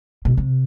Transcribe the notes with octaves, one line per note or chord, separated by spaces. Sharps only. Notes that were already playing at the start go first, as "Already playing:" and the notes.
B2
C3